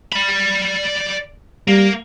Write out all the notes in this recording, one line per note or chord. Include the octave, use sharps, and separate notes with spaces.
D5 B5
G3 A#3